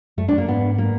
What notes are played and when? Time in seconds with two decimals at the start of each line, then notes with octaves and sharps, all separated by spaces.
0.17 F#2 A3
0.28 D4
0.33 F#2 A#3
0.48 G#2 B3
0.78 A#3